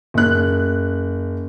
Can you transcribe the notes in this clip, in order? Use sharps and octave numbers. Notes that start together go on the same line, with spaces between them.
F#1 F#6